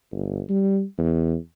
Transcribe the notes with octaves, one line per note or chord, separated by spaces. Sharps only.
G1
G3
E2